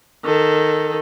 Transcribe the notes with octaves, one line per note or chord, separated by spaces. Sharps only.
D#3 A4